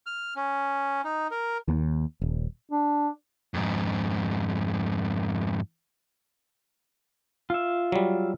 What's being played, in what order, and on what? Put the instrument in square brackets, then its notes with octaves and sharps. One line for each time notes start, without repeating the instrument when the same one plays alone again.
[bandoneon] F6
C#4
D#4
A#4
[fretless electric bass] D#2
D#1
[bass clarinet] D4
[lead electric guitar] F2 G#2
[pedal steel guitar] F4 E5
[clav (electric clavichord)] F#3 G3